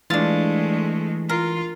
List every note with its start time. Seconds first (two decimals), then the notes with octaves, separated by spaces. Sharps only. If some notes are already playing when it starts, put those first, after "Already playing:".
0.10 E3 G#3 A3 D4 F4 A6
1.29 F4 A#4